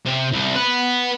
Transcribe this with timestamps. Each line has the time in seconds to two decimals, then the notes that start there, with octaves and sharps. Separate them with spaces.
0.05 C3
0.32 C2
0.55 B4 F#5